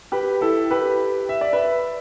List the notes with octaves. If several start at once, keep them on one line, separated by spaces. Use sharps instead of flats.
G4 B4
E4 A4
G4 B4
E5
D5
B4 E5